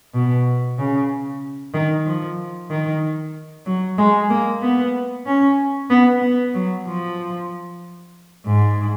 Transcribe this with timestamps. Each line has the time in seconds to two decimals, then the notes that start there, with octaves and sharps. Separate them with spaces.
0.14 B2
0.78 C#3
1.74 D#3
2.06 F3
2.70 D#3
3.66 F#3
3.98 G#3
4.30 A#3
4.62 B3
5.26 C#4
5.90 B3
6.22 B3
6.54 F#3
6.86 F3
8.46 G#2